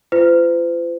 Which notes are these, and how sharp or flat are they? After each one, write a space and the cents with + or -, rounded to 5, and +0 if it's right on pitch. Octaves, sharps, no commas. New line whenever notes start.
F4 -35 C5 -45